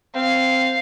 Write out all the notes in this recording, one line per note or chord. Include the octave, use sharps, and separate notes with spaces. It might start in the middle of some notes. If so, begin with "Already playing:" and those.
C4 F5